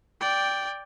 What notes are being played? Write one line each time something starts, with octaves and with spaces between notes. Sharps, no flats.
D5 G5